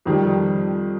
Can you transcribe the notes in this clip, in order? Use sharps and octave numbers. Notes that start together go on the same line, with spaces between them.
F2 D#3 G3